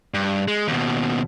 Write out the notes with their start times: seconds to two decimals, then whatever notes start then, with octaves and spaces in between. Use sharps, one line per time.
0.14 G2
0.48 G#3
0.68 D#2 B2